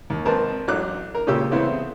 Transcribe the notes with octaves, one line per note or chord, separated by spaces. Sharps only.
D#2
G#1 C4 A#4 B4 D#5 A5
A1 F#3 D6 F#6
A#4
A#2 C#3 C#4 G4 E6
C#3 E3 A3 B3 C4 E4